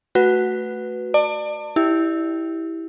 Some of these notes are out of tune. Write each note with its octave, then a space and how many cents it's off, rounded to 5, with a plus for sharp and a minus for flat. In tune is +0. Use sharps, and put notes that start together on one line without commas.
A3 +0 F#4 +0 B4 +0
D5 +30 A5 +35
E4 -10 G4 +0